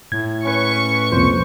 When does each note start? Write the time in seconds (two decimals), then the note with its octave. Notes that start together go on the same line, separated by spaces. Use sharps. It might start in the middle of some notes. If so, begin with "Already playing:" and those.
0.12 A2 G#6
0.45 C#4 B4 C#6
1.12 C2 F2 A#2 C5